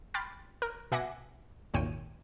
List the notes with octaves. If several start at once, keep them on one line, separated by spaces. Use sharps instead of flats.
G5 B5 C6 D6 F6 A6
A#4
B2 E5 F#5 G#5 D6 A#6
G#1 D#2 A#2 C#5 G5 D#7